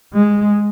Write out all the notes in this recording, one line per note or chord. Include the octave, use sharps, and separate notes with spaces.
G#3